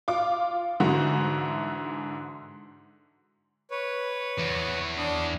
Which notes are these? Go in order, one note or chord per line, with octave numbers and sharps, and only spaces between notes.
F4 D6
G#2 D3 E3 F#4
B4 C#5
E2
D4 D#6